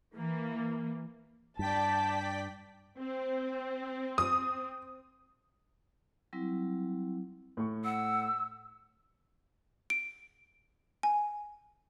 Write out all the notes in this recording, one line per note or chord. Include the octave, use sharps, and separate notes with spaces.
E3 A#3
G2 D5 G5 A5 B6
C4
D#6
F#3 G3 C4 E4
A2 C#6
F#5 E6
D7
G#5